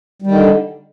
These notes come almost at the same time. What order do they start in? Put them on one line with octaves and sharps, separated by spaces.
G3 D#3 D3